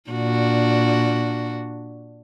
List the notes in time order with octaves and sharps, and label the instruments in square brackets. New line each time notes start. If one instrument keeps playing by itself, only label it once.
[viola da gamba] A#2 D4 F#4